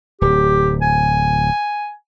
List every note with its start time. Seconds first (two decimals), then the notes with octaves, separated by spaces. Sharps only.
0.21 D1 G4
0.82 G#5